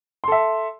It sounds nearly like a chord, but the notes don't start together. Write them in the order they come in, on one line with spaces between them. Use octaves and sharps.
C6 A4 E5